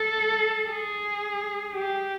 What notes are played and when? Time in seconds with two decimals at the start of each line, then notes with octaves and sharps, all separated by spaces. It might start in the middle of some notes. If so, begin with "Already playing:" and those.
Already playing: A4
0.70 G#4
1.75 G4